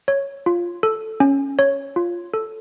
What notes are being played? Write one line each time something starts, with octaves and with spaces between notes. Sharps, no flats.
C#5
F4
A4
C#4
C#5
F4
A4